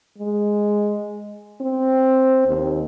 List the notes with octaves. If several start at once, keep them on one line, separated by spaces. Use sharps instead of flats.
G#3
C4
D#2